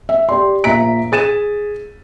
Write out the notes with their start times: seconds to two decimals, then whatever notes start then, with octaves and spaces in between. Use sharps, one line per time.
0.09 E5
0.29 G4 D5 C6
0.64 A#1 A#2 E5 A#5 B6 D7
1.12 G#4 A6 D#7 E7